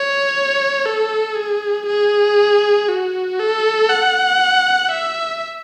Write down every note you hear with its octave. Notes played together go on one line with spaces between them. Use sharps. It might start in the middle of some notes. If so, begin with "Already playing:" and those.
Already playing: C#5
A4
G#4
G#4
F#4
A4
F#5
E5